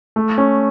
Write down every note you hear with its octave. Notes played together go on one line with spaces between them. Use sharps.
A3
C#4